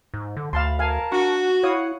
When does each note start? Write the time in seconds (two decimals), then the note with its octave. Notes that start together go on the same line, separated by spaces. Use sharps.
0.14 G#2
0.37 D3
0.53 D2 F5 A5 B5 C6
0.79 A#4 F5 G#5 A5
1.12 D4 F#4 C#6
1.63 E4 C#5 F5 F#5 D#6